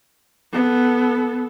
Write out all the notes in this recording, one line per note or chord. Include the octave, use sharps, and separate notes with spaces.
B3 A4